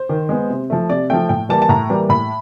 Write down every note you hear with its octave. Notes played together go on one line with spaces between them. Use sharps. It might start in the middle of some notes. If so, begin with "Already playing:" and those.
Already playing: C5
D#3
G#3 B3
C3
F3 A3
C3 D5
F3 A3 G5
A2 G5
E3 G3 A#3 A5
A5
A2 A#5
E3 G3 A#3
A2 B5